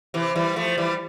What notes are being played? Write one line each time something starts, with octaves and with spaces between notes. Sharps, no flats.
C3 E3
E3 G3
F3 A3
E3 G3